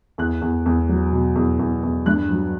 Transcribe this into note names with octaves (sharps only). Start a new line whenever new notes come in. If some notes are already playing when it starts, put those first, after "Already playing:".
E2 F#6
E2
E2
F#3
B2
E2
E2
E2
G2 F#6
F#3